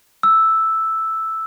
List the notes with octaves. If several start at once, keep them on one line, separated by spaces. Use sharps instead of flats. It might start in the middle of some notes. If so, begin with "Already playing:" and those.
E6